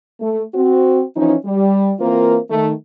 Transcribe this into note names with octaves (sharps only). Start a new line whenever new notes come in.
A3
C4 F#4
E3 F3 C#4 D#4
G3
E3 A#3 C4 F4 A#4 C5
D#3 A3